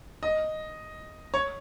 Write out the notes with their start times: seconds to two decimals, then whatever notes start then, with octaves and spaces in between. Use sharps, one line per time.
0.23 D#5
1.34 C#5